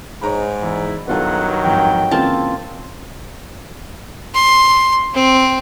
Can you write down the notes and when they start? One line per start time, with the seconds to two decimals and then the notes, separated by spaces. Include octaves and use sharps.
0.21 G#2 C#5 A#5 B5
0.62 E2 E4
1.08 G2 D#3 F#3 B3 F4 A4 F#5
1.65 F2 G#2 G5
2.11 C#3 E3 A#3 C4 F4 A5
4.35 C6
5.14 C4